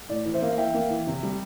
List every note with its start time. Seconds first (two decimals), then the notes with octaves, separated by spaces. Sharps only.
0.09 A2 D5
0.26 E3
0.34 C5 E5
0.42 A#3
0.51 F5
0.58 E3 E5 G5
0.74 A#3
0.90 E3
1.07 C3
1.23 G3